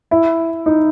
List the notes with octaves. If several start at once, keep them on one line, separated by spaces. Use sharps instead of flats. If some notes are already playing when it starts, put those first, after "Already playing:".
E4
D#4